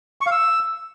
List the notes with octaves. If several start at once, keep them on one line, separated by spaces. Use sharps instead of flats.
C#6
F5
E6